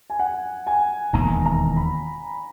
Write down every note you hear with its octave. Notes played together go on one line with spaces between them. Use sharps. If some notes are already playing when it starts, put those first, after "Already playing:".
G#5
F#5
G#5
E1 D#2 D#3 A#5
A#5
B5